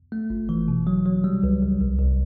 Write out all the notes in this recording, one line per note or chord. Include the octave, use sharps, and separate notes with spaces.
A3
G1
E3
B2
F#3
F#3
G3
C#2
C#2
C2
C2